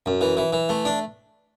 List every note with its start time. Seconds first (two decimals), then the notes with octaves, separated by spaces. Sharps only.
0.06 F#2
0.21 E3
0.37 E3
0.53 E3
0.69 A3
0.85 D4